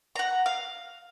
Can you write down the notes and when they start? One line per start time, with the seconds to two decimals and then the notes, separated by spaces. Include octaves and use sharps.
0.16 F#5 A#5
0.46 F5